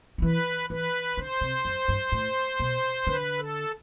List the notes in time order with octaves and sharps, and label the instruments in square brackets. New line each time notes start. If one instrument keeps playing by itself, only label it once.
[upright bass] D3
[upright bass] E3 [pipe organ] B4
[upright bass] E3 [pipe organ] B4
[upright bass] D3 [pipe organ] C5
[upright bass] C3
F#2
G2
A2
B2
[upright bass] D3 [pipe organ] B4
[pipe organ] A4